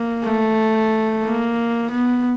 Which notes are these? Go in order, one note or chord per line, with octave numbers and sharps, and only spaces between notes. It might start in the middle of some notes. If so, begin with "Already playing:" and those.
Already playing: A#3
A3
A#3
B3